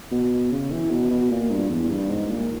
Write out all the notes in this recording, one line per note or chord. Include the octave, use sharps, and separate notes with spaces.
B2
C#3
E3
B2
B2
A#2
G2
E2
G2
G#2
A#2